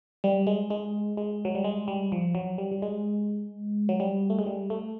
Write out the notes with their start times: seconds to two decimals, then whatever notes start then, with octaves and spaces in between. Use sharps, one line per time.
0.24 G3
0.47 G#3
0.70 G#3
1.17 G#3
1.45 F#3
1.55 G3
1.64 G#3
1.88 G3
2.12 F3
2.35 F#3
2.58 G3
2.71 G3
2.82 G#3
3.89 F#3
4.00 G3
4.30 A3
4.39 G#3
4.46 G3
4.70 A3